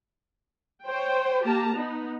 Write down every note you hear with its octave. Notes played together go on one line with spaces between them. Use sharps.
C5 C#5 G5
A#3 G4 A5 A#5
B3 D#4